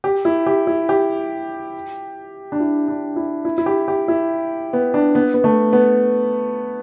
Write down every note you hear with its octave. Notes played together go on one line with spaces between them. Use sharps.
G4
E4
G4
E4
G4
D4
E4
D4
E4
E4
E4
G4
G4
E4
B3
D4
B3
B3
A3
B3